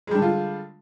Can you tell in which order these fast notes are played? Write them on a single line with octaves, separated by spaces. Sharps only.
G#3 G3 D4 D3 F4